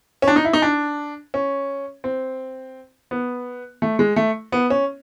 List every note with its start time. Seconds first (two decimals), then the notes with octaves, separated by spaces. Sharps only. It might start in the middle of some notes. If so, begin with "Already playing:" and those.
0.22 C#4
0.28 D4
0.36 D#4
0.45 E4
0.53 D#4
0.62 D4
1.34 C#4
2.04 C4
3.11 B3
3.82 A3
3.99 G#3
4.16 A3
4.52 B3
4.70 C#4